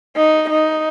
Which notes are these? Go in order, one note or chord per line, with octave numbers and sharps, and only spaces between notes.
D#4
D#4